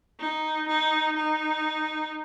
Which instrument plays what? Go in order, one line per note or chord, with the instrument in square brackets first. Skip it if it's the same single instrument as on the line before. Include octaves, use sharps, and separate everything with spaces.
[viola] D#4
D#4
D#4